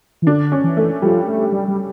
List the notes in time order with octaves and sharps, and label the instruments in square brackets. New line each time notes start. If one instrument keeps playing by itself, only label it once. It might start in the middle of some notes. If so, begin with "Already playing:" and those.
[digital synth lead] E3
[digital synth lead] D3 [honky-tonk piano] D4
[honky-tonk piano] C#4
[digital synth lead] E3
[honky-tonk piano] A3
[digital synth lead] F3 [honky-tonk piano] G3
[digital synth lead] A3
G3
G3